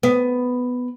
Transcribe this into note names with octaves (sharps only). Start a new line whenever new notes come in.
B3